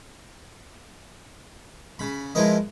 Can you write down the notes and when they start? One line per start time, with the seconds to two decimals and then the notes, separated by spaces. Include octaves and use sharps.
1.99 C#3 B5
2.35 F3 G#3 E4 A#4 B4 D#5